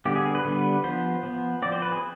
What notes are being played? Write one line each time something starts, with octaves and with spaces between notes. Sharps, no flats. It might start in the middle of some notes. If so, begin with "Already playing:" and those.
D3 G3 B3 G4
G#4
G#4
B4
D3 G3 B3
F3 B3 C5
F3 B3
F3 C4 D5
C5
B4
G#4